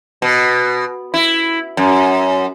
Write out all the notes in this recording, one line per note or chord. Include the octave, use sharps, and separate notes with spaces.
B2
E4
F#2